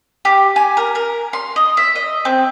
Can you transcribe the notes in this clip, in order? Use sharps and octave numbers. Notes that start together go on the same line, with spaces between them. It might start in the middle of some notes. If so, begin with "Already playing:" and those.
G4
G#5
A#4
A#4
C6
D#5
E5
D#5
C4